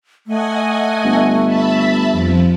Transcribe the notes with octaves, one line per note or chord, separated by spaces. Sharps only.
A3 D#5 F#5 G#5
G1
E5 A5 B5
F2 F3